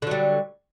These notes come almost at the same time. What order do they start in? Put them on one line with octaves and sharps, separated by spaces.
D3 F#3 G3